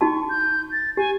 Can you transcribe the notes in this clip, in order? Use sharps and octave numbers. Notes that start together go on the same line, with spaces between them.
D#4 F#4 A5 C#6
G6
A6
G4 G#5